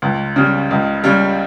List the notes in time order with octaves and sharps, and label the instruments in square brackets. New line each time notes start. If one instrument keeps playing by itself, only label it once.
[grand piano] C#2
C#3 G3
C#2
C#3 G3